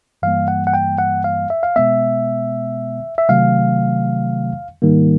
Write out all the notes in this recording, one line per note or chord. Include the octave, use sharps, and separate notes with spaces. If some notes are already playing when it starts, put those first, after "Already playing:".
G2 E3 G3 A#3 F5
F#5
F#5
G5
F#5
F5
E5
F5
B2 G#3 B3 E5
E5
C3 D#3 F#3 A3 F5
G#2 D#3 G3 A#3